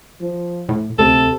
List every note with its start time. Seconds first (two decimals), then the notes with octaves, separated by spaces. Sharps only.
0.21 F3
0.69 A2
0.99 D2 C3 A4